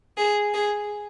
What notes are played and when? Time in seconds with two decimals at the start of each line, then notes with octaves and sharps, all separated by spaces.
0.18 G#4
0.54 G#4